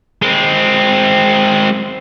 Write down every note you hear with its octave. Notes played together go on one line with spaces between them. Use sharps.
G#3 C4